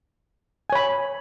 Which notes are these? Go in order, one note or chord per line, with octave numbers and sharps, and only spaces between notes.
C#5 G#5 B5